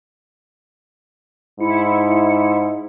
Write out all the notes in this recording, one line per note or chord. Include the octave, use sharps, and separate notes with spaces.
G#2 E4 C#7